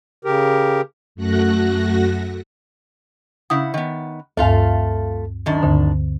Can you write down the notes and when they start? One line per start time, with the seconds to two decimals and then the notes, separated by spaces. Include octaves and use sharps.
0.25 C#3 G4 A#4
1.15 F#2 A3 F#4 F#6 A#6
3.50 C#3 E4 F#5 D#6
3.74 D#3 B3
4.37 D2 G2 A3 F4 F5
5.46 F#2 D#3 D4
5.63 D2 G2 D3